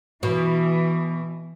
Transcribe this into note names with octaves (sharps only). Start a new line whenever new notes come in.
B2 E3